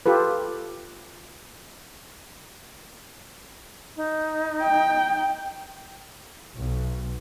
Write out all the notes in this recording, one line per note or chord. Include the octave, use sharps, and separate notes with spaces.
F4 G4 A4 B4
D#4
G5
B1